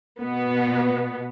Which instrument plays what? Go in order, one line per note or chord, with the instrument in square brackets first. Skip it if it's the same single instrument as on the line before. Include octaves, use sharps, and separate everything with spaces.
[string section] B2 B3